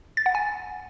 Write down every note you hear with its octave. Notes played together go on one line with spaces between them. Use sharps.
A6
F#5
G#5